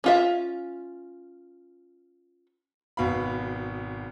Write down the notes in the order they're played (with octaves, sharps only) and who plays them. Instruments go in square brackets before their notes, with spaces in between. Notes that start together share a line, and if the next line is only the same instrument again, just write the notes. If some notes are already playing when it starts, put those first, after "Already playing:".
[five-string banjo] C#4 F4 E5
[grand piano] G#1 B2 F5 B5